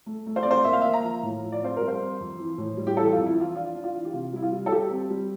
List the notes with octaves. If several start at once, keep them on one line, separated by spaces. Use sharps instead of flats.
A3
A3
C5
C4 D5
C5
A#3 E5
F5
A#3 E5
A#5
F3
A2
F3
D5
C4 C5
G3 A#4
C5
C4
F2
E3
A2
G3
G4
E3 A4
F2 F4
E4
E3 F4
D4 F4
D4
F4
E3
G4
C3 F4
G3 E4
F4
G3
A4
G3 G4
C4
G3